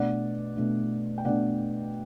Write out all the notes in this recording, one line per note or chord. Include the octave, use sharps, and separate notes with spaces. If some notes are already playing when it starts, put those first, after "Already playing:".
Already playing: B2 A3 D4 D5 F#5
B2 A3 D4
G5
B2 A3 D4 D5 F#5